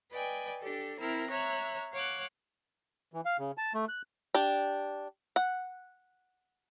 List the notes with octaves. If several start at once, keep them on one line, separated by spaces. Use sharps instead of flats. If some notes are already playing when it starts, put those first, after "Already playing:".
B4 D5 D#5 G5 G#5
D4 G4 A4
C4 E4 A#4 E6 F6 A#6
C#5 E5 A#5 F#6
C#5 F5 F#5 D6 F#6
E3
F5
C#3
A5
A3
F#6
D4 G4
F#5